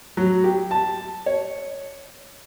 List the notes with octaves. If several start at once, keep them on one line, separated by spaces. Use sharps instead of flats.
F#3
G4
A5
C#5